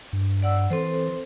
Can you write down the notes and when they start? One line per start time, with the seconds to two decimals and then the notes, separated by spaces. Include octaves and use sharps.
0.13 G2
0.42 D5 F#5 E6
0.70 E3 C4 A4 C5